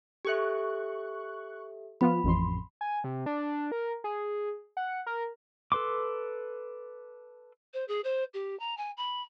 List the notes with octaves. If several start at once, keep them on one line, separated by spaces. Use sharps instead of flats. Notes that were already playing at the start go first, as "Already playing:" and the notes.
G4 A4 E5 C#6 F#6
F3 B3 F4 B5
A1 F2 C6
G#5
C3
D4
A#4
G#4
F#5
A#4
A4 B4 C6 D6
C5
G#4
C5
G4
A#5
G#5
B5